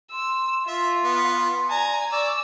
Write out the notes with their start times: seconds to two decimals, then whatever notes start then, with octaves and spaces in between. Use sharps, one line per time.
0.12 C6 E6
0.68 F4 E5 C6
1.04 B3
1.70 D5 G#5 A#5
2.12 D5 C#6 E6